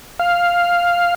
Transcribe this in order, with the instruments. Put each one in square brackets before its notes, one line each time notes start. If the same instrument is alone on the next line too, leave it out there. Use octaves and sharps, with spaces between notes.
[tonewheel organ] F5